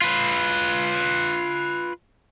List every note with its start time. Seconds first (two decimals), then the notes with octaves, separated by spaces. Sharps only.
0.02 F4 B4